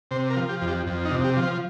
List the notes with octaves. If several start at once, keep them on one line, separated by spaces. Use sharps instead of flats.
C3 C5
A#4
F3
G4
F2
G4
F2
D#4
C3
G4
F3
C5